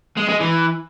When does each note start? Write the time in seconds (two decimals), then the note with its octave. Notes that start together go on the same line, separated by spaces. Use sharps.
0.17 G#3
0.29 G#3
0.41 E3